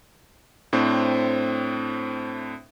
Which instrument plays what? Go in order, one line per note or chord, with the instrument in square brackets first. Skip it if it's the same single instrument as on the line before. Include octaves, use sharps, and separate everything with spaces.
[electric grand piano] A2 C4 D4 C5